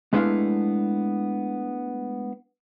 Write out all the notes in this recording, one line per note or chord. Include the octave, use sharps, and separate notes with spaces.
G#3 A3 B3 D4 E4 F5